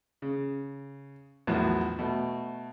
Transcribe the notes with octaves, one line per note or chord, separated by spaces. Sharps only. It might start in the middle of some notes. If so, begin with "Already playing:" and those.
C#3
A#1 E2 A2 F#3
B2 A3